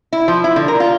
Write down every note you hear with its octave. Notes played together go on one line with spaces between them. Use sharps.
E4
F3
E4
D3
A#4
F4